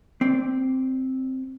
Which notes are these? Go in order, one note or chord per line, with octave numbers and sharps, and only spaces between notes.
C4 D5